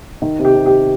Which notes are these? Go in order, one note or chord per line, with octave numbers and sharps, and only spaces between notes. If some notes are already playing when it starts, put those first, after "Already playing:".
D#3
C3
G4
C3
G4